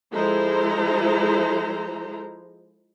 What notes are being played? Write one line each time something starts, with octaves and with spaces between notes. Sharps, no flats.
F3 G#3 E4 A4 C5 A#5